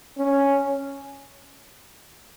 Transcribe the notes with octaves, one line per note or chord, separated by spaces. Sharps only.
C#4